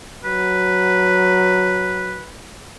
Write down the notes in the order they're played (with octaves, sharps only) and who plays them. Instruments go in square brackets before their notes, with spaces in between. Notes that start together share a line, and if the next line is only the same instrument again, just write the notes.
[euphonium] F#3 [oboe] B4